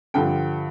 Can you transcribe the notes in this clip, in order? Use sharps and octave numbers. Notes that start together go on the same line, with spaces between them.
G2 D3 F3 G5